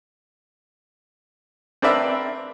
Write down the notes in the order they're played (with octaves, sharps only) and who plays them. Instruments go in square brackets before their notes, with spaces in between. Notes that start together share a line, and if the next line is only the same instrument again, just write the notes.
[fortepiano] C4 D4 A#4 B4 D5 E5